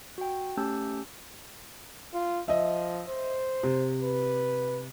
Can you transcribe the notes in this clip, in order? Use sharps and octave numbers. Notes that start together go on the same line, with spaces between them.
F#4 G5
A3 C#4 G4 A5 E6 G6
F4
F3 D#5 E5
C5
C3
B4